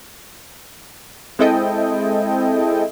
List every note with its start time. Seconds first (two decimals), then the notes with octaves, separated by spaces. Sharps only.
1.39 G#3 C4 E4 A4 D#5 G5